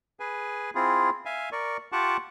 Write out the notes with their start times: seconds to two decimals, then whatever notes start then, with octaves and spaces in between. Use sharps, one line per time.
0.20 G#4 B4 G#5
0.75 C4 E4 F4 G#4
1.26 E5 F5 G#5
1.52 A#4 D5 C#6
1.92 F4 G4 F#5 A5 C#6 D6